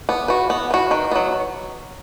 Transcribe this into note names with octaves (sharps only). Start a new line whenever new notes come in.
B3
F#4 B4
B3
F#4 B4
D#3
F#3 B3